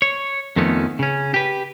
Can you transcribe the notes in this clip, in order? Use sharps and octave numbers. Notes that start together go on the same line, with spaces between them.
C#5
F2 D#3 F3 A3 B3 C#4
C#3 C#4
G4 B4